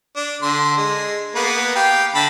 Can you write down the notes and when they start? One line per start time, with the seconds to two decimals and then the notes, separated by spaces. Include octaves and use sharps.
0.16 D4
0.42 D3 C6
0.77 G#3
1.35 A#3 B3 B4
1.76 G4 F5 G5
2.15 D3 A5 B5